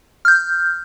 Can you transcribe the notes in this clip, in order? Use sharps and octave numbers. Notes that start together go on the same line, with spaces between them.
F6 G6